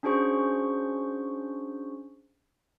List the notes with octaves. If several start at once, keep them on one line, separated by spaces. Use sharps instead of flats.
C#4 D4 F#4 G#4 C5 C#6